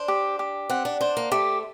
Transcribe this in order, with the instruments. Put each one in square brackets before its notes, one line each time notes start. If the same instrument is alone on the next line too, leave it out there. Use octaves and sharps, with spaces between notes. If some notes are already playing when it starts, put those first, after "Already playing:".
Already playing: [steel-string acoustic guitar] D4 [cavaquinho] C5
[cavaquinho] G4
G4
[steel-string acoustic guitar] C4 [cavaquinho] F#5
[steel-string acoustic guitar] D4
[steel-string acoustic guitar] D4 [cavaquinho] C5
[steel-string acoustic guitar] A#3
[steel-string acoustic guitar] A3 [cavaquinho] G4